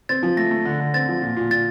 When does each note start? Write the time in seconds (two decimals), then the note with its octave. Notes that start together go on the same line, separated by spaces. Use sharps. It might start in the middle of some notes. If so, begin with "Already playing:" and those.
0.09 C4 A6
0.23 F3
0.37 A3 A#6
0.51 A3
0.65 D3
0.80 D3
0.94 C4 A6
1.08 F3
1.22 A#2
1.37 A#2
1.51 A#2 A6